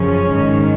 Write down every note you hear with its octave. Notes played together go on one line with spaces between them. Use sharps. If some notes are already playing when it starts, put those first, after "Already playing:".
Already playing: F#2 C#3 F3 C#4
G#2 D#3